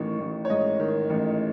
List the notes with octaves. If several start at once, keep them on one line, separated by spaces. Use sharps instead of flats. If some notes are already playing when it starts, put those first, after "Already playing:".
Already playing: A1 D#3 C#6
A1
C#5
G#2 D#5
D#3
A1